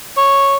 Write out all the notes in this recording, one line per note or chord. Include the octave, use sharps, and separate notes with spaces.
C#5